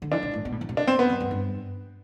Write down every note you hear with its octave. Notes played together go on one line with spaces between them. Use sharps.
D3
E3 D4
C3
A2
B2
A2
E3
C3
D4
C4
B3
F#2
F#2
G2